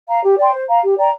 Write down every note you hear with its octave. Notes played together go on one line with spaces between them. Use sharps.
F5 A#5
G4
D5 G5 C6
C5
F5 A#5
G4
D5 G5 A#5